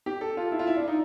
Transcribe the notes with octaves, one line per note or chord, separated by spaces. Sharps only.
G4
A4
F4
E4
F4
E4
D4
D#4